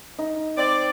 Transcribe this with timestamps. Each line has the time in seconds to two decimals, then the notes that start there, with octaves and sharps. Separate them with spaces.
0.19 D#4
0.58 C4 D5